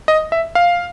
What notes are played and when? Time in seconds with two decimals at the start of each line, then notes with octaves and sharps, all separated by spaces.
0.08 D#5
0.32 E5
0.55 F5